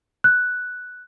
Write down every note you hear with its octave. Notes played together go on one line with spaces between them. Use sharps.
F#6